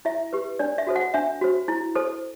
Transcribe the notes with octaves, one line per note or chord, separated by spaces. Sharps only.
E4 E5
G4 B4
D4 D5
E5
F#4 A4 C5
F#5
D4 E5
F#4 C5
E4
A4 C5